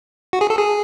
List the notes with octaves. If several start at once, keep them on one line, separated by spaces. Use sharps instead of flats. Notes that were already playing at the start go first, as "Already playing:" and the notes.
F#4
G#4
A4
G#4